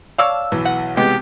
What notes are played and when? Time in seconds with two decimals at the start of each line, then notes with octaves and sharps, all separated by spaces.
0.18 C#5 D5 F5 A5 E6
0.52 B1 E3
0.65 F#5
0.97 C3 G#3 B3 G4 G5